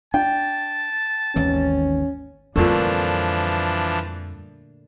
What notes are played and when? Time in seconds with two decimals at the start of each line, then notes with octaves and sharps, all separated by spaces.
0.14 D4 G5 A5
1.36 G#1 D#2 E3 C#4
2.56 F2 A#2 D3 E3 F3 G3 A3 D4